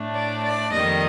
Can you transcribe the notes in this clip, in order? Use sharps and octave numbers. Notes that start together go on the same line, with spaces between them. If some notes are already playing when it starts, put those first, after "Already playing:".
Already playing: A2 A3 D4
D5
D5
F2 D#3 G3 A#3 D#5